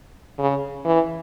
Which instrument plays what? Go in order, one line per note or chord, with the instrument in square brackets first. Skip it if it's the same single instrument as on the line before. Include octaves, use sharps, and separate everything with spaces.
[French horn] C#3
E3